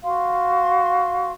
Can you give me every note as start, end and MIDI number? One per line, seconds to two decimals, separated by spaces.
0.03 1.32 66
0.03 1.32 77
0.03 1.32 84